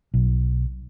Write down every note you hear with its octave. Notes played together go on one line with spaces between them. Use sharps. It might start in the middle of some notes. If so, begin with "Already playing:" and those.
B1